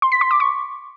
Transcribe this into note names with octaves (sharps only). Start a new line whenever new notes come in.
C6
B6
C6
D6
C#6